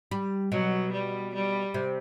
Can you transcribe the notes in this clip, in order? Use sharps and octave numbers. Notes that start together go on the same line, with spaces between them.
G3
B2 F#3
G3
G3
C3